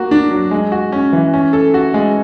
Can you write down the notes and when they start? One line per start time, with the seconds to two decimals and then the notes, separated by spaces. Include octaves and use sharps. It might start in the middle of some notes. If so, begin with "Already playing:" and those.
Already playing: A#3 F#4
0.11 D4
0.31 F#3
0.51 G#3
0.72 F#4
0.92 C#4
1.13 E3
1.34 C#4
1.53 A4
1.74 F#4
1.94 G#3